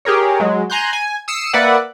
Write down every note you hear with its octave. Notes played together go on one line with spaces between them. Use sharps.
G4 G#4 A#4 C#5
F#3 G#3
G#5 A#5 C6 F#6 G6
G#5
D#6 E6 C7 C#7 E7
A#3 B4 D5 E5 F#5